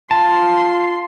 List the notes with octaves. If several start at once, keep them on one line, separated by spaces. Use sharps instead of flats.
F4 A5 C6